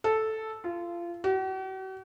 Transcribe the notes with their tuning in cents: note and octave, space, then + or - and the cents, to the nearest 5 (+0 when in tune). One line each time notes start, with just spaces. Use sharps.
A4 -5
F4 -25
F#4 +45